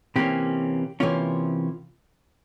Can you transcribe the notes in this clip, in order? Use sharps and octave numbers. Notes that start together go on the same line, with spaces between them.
C3 E3 A#3 C#4 G4
C3 E3 A#3 C#4 F4